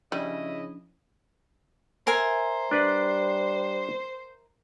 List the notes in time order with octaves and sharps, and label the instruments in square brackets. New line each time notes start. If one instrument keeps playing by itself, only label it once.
[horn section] C#3 D#5 [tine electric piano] F3 C#4 D4 [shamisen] G3 [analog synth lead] E4
[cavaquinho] A#4 E5 G#5 [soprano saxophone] C5
[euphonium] G3 [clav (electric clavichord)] D4 B4 D5